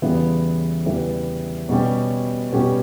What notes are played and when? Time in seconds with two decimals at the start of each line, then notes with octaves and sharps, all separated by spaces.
0.02 E2 C#3 E3 G3 B3
0.86 E2 C#3 E3 G3 B3
1.69 B2 G3 C#4 G4
2.52 B2 G3 C#4 G4